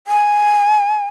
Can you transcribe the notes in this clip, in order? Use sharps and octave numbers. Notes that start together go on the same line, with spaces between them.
G#5